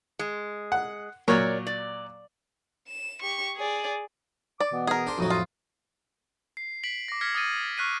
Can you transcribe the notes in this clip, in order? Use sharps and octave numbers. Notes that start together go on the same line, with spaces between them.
G#3
F#5
A#2 F#3 A#4 C#5 D5 C#6
D5
E7
G4 C#6
G#4 D5
D5 D6
B2 E3 B3
G#4 A#4
D4 C5
F2 A2 F#3 D#4 F#4 D#6
F4
C7
B6 D7 F#7
D6 A#6
F6 G#6 A#6 B6 C#7
D#6 F6 A6 D#7
C#6 F6 F#6 B6 C7 D#7